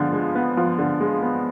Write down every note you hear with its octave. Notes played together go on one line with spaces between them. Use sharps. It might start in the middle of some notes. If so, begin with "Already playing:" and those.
Already playing: D3 F3 G#3 B3
G#3
B3
F3
D3
G#3
B3